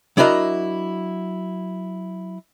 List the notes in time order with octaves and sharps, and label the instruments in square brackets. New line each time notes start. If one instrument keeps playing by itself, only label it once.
[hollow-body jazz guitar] F#3 D4 E4 F#4 A#4 D#5